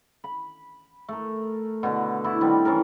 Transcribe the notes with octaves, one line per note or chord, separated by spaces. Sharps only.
B5
A3 A#4
B2 D3
E4 F#4 D5
D#3 G3 C4 D4
E3 C#4 A4 A#4